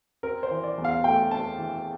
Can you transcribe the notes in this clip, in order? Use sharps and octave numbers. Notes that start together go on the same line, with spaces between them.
C4 A#4
C5
E3
D5
E2
F5
A3 G5
C4 A5
E3